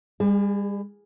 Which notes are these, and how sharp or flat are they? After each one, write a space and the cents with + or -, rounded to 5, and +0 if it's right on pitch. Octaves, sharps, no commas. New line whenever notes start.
G3 +40 G#4 -5